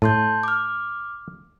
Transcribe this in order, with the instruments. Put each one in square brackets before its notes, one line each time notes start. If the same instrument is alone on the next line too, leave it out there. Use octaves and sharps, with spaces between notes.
[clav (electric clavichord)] A2 [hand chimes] A5 C6 G6
[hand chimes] D6 F6